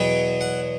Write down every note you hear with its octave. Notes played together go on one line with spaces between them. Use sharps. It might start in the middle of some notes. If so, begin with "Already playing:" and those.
Already playing: E2 B2 F#3 G5
F#5